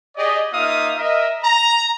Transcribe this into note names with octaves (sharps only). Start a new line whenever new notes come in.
G4 G#4 D5 D#5
A#3 D#4 F4 E5 F5 D#6
A#4 D#5 E5
A#5